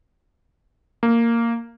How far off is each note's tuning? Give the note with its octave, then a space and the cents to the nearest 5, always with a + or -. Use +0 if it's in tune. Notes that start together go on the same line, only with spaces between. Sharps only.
A#3 -10